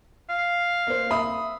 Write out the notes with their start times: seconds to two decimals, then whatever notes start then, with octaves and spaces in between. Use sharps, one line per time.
0.30 F5
0.87 A#3 C5
1.11 E5 B5 D#6